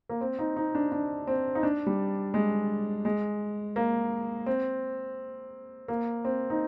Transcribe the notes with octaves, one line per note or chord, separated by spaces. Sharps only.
A#3
C4
D#4
D#4
D4
D4
C4
D#4
D4
G3
G#3
G#3
A#3
C4
A#3
C4
D#4